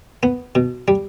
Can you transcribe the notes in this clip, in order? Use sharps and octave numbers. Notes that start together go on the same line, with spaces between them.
B3
B2
G3